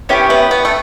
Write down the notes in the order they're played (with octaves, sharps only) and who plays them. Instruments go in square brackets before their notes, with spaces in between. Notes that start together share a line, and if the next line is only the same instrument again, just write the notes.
[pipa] B3 [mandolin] C#4 E4 G4 C#5
[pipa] B3
B3
A3